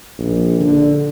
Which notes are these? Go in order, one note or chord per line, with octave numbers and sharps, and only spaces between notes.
A#1
D3